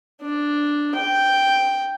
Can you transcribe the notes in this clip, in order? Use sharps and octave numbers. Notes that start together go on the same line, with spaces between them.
D4
G5